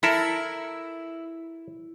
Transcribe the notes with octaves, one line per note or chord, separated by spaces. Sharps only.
E4 A4 A#4 E5